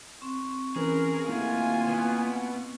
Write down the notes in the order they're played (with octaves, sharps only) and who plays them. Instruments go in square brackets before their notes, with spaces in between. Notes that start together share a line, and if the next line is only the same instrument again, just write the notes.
[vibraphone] C4 C6 C#6
[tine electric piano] E3 C#4 B4 [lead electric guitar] G#4 [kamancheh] A#4
[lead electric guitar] A#2 D#3 [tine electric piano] A3 A#3 E4 [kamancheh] F4 G#5
[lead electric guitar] B2 B3